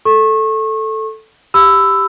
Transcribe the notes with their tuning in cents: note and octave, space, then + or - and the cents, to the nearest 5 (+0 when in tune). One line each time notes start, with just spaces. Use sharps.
A4 +0 C#6 -30
G4 +0 B5 +30 E6 +0